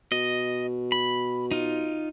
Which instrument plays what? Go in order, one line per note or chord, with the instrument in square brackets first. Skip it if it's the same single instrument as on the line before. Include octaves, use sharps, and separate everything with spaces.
[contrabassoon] B2 [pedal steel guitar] D#5
[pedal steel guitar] B5
D#4 F4